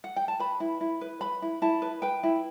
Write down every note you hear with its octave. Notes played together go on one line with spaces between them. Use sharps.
F#5
G5
A5
B4 B5
E4
E4
B4
B4 B5
E4
E4 A5
B4
B4 G5
E4